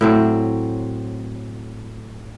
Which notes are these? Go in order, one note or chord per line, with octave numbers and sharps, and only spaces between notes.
A2 F#3 C4